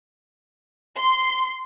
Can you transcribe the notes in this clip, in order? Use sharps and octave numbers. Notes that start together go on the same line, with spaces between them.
C6